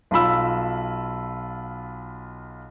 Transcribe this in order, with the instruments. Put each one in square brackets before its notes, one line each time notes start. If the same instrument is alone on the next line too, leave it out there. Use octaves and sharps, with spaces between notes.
[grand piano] B1 F4 B5 E6